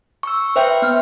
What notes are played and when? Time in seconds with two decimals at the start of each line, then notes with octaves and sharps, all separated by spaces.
0.23 C#6 E6
0.56 B4 C5 E5 G5
0.82 B3 F6